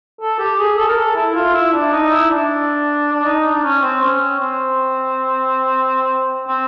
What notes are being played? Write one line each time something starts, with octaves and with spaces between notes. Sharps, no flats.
A4
G4
G#4
A4
A#4
A4
E4
F4
E4
D4
D#4
E4
D4
D4
D#4
D4
C#4
C4
C#4
C4
C4